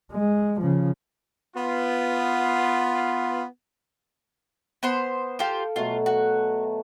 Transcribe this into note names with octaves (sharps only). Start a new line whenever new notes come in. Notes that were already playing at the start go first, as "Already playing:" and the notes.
G#3
C#3 F3
B3 F4
B3 C5 C6
F4 G4 A4 C5 F5 G5
B2 F#3 A3 F4
F#4